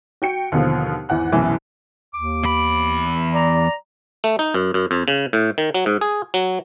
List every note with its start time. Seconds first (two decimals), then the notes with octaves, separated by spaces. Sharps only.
0.22 F#4 G5 C#7
0.52 D#2 B2 D3 F3
1.09 G#1 E2 E3 F#5 F#6
1.32 C2 F#2 B2 E3
2.15 D#2 D6
2.43 E2 B5
3.34 D5 A#5
4.24 A3
4.39 D#4
4.54 F#2
4.74 F#2
4.91 F2
5.08 C#3
5.33 A2
5.58 D#3
5.74 F#3
5.86 G#2
6.01 G#4
6.34 F#3